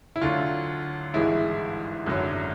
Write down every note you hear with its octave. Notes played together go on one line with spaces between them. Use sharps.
E4
D2 D3 F#3 F4
G#1 G2 E3 G#3 E4
G#1 F#2 D3 F#3